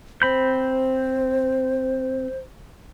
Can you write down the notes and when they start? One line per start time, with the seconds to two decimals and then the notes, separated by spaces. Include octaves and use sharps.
0.22 C4 C5 B5 G6